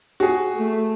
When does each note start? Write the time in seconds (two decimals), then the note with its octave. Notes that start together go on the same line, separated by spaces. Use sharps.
0.20 F#4 G#4
0.55 A3